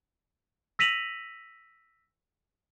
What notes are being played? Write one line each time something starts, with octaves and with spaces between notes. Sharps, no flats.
E6 A#6 B6 D#7 F7 F#7